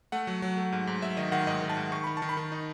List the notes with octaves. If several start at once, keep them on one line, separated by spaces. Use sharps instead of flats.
A3 F#5
F#3
F#3
A3
G#2
G#2
F#3 E5
D#3 D#5
D#3 F#5
G#2 D#5
D#3
A5
G#2
D#3 C#6
D#3 B5
A5
D#3
B5
D#3
D#4